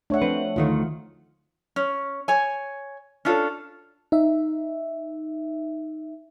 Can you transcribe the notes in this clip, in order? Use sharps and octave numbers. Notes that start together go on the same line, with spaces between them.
A3 D4 C#5 E5 F#5
F3 C4 B4
D2 D#3 A3 F4
C#4
C#5 G#5
C#4 D4 F4 A4
D#4 E5